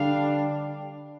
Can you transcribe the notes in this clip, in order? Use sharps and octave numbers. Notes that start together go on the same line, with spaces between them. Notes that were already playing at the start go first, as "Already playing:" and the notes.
Already playing: D3 G3 D4 F5